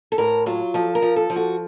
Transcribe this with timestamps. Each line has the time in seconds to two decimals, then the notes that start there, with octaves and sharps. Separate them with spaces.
0.12 A4
0.18 A2 A#4
0.46 F#3 F4
0.74 F3 A4
0.95 A#4
1.02 F3
1.16 A4
1.30 F3
1.36 F#4